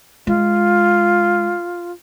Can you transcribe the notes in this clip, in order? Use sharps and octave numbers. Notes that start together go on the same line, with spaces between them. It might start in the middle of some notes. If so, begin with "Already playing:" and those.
G#3 F4